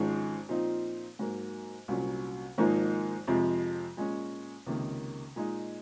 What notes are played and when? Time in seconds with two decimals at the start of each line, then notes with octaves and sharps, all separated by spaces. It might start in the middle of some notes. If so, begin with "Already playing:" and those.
Already playing: G#1 G#2 F3 G#3 C#4
0.49 A#2 F3 C4 D#4
1.19 G#2 F#3 A#3
1.88 C2 A#2 F#3 C#4
2.58 G#1 G#2 F3 A#3 D#4
3.27 F2 C3 F3 G#3
3.97 A#2 G#3 C#4
4.66 C#2 C3 D#3 A#3
5.36 A#2 G#3 D#4